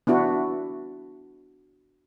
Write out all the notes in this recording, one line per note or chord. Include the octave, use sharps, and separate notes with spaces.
B3 D4 E4 F#4